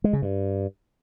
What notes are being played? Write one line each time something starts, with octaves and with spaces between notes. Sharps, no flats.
G#3
C#3
G2